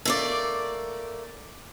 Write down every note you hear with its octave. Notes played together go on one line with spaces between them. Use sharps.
A3 A#3 D5